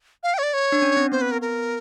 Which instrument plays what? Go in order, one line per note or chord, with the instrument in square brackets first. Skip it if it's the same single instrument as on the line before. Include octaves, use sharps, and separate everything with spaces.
[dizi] F5
G5
C#5
D5
C#5
[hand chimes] D4
C#4
C4
[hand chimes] B3 [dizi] C5
[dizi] B4
A#4
A#4